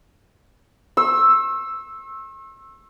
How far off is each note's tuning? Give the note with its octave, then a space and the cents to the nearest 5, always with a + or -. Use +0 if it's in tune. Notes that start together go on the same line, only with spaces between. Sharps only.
C#6 -45 E6 +0